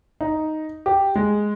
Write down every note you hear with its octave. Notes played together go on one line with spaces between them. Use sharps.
D#4
G4
G#3